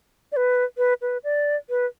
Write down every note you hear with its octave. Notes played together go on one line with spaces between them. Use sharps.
D5
B4
B4
B4
D5
B4